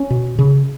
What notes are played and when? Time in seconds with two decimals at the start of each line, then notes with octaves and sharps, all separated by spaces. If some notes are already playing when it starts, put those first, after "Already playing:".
Already playing: C#4
0.10 B2
0.39 C#3